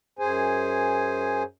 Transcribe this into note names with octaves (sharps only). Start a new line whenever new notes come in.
F#2 G#4 C5 G#5